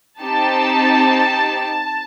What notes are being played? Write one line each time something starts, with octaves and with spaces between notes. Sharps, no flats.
C4 D#4 G4 A5